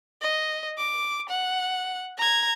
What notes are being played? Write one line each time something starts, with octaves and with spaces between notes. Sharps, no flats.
D#5
D6
F#5
A#5 G#6